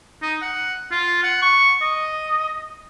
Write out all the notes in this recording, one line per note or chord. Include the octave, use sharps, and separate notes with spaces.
D#4
F#5
F4
F#5
C#6
D#5